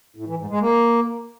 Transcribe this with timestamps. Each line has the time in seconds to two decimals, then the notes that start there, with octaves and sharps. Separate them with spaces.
0.16 A2
0.28 E3
0.39 G#2
0.50 G#3
0.61 A#3